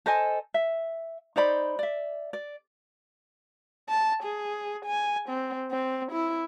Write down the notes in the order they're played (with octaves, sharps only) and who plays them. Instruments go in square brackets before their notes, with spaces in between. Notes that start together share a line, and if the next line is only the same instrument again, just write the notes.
[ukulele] A4 C5 D#5 G#5
E5
D#4 C5 D5 B5
D5 E5
D5
[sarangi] A5
G#4
G#5
C4
C4
E4